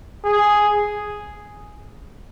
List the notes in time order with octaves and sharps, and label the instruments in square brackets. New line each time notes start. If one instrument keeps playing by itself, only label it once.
[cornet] G#4